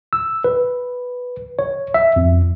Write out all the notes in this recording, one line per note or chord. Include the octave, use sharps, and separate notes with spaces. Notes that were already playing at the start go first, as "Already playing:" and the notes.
E6
B4
C#5
E5
F2